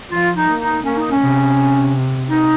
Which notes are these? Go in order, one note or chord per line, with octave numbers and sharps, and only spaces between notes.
F3 F4
D#4
A#3
D#4
A#3 C#4
D#4
C#4
C3
D#4